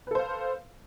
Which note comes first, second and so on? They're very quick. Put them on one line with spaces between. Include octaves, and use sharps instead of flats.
B4 A4 C5 F5